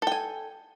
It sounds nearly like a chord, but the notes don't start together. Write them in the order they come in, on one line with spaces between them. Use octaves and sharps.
A4 G5 G#5